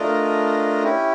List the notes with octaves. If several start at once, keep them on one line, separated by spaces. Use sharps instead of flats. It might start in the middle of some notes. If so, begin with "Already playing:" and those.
Already playing: A3 D4 F4 A#4 D#5
C#4 E4 G4